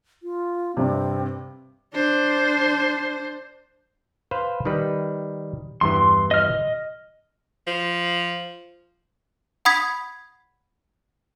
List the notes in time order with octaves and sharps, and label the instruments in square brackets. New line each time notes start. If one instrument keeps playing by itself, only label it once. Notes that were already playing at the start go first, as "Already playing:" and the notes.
[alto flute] F4
[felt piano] G2 C3 [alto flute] C4
[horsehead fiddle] D4 C5
[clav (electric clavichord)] B4 C5 F5
D#3 G3 B4
[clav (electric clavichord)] E2 G2 E3 [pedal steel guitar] C6
[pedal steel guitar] D#5 F6
[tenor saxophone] F3
[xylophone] F#5 B5 D#6 G#6 B6